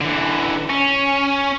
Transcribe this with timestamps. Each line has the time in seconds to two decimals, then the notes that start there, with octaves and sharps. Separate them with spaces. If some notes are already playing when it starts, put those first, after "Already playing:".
0.01 D3 E3
0.70 C#4